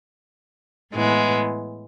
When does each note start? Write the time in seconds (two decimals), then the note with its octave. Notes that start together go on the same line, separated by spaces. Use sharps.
0.93 A2 E3 G#3 B3